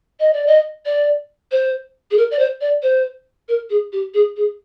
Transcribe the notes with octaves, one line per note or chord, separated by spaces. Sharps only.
D#5
D5
D#5
D5
C5
G#4
A#4
D5
C5
D5
C5
A#4
G#4
G4
G#4
G#4